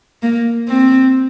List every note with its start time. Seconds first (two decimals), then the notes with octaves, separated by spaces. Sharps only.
0.22 A#3
0.68 C4